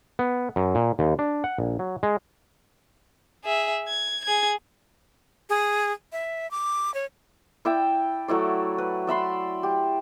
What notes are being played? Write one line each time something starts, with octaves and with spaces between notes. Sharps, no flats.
B3
F#2
A#2
D#2
D4
F#5
A#1
F#3
G#3
G#4 E5
G#6
G#4 G#6
G#4
E5
D6
C#5
E4 D5 E5 G5
F#3 A3 E4 D5
B4
D5 E5 B5 C6
G4